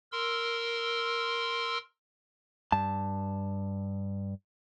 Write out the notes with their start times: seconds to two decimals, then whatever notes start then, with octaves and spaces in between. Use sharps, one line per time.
0.12 A#4 C6 E6
2.72 G2 A5